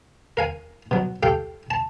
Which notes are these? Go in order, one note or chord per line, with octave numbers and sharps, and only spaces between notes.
A#4 F5 G#5
B2 F#3
G4 A4 F5 G5
A5